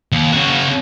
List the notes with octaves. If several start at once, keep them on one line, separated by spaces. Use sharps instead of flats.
D#2
C#3 F#4